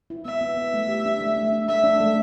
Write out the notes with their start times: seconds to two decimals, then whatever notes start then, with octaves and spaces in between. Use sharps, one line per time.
0.10 E4
0.25 B3 E5
0.41 B3
0.57 B3
0.74 A3
0.89 G4
1.05 D4
1.21 A3
1.37 A3
1.52 D4
1.68 A3 E5
1.84 D4
2.00 A3